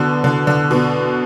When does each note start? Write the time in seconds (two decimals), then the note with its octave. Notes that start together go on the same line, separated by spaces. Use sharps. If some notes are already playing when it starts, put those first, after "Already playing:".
Already playing: B2 D3
0.24 D3
0.47 D3
0.71 B2